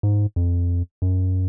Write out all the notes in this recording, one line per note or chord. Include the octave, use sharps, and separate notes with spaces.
G#2
F2
F#2